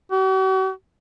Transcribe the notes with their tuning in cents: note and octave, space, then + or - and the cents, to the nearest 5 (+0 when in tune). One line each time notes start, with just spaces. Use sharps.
F#4 +45